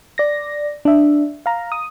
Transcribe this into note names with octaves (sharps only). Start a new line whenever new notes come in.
D5 A#6
D4 E5
F5 A#5
D#6